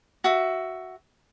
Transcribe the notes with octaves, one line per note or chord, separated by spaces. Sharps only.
F#4 E5